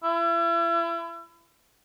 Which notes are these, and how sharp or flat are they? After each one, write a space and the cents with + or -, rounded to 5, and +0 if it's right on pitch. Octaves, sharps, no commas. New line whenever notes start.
E4 +35